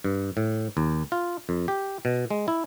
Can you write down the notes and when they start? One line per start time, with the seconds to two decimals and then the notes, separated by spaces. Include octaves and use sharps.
0.04 G2
0.37 A2
0.77 D#2
1.12 F4
1.49 F2
1.68 G4
2.05 B2
2.31 G#3
2.48 E4